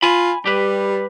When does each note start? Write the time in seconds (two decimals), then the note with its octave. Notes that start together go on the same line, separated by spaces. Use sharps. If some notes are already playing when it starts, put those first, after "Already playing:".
0.03 F4 G#5 B5
0.46 G3 G4 B4